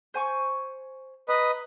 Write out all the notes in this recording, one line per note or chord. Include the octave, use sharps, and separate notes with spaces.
C5 G#5 C#6
B4 D#5 A#5